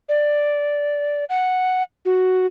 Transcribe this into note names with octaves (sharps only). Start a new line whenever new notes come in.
D5
F#5
F#4